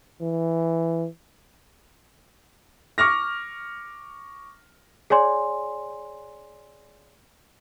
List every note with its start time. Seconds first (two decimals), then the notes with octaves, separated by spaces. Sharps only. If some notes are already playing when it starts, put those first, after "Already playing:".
0.21 E3
2.98 C#6 D6 F6 A#6
5.10 G#4 C#5 D5 G#5 C6